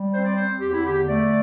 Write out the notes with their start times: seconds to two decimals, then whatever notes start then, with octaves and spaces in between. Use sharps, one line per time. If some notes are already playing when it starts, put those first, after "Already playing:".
Already playing: G3
0.14 C4 C5
0.25 D5
0.36 C4 C5
0.60 E2 G4
0.73 E4
0.84 D3 G4
1.06 A3 D5